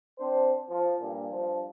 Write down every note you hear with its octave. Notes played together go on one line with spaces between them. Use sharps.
C4 D4 C5
F3
G2 A#2
G2 F3